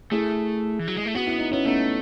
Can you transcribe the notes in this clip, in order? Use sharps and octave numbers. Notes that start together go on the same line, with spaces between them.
A3 E4 G#4
E3
F#3
G#3
A3
B3 F#4
E4
D#4
B3 C#4 E4
A3 B3 D#4